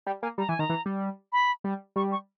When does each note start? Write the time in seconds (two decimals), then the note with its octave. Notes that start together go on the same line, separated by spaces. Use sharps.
0.07 G3 G5
0.22 A#3 G#5
0.38 G3 A#5
0.49 E3 G#5
0.59 D#3 A#5
0.70 E3
0.86 G3
1.32 B5
1.64 G3
1.96 G3 C#6
2.12 C#6